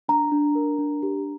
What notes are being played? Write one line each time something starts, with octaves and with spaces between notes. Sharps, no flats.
D4 A#5
D4
A#4
D4
G4